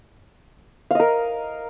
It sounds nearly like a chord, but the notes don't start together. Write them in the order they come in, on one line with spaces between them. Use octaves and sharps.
F5 D#5 A#4